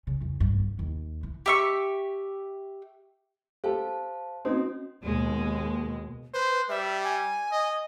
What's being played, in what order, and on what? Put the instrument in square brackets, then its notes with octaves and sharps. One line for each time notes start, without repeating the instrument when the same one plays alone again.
[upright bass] C#3
E2
G2
B3
D#2
E3
[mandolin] G4 E5 C#6
[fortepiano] G4 A4 [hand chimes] C5 F5 A5
[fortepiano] C4 D#4 [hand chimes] C#4 F#4
[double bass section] D#2 B2 [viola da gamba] G#3
[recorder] B4 [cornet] C5
[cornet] G3 [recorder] E5
[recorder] G#5
[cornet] D#5